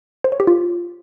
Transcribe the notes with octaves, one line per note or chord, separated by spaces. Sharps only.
C5
C#5
G4
F4